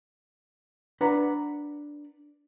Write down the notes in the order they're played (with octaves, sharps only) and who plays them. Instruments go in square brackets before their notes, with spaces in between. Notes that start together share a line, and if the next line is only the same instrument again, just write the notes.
[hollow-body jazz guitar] D4 B4 F#5 A#5 B5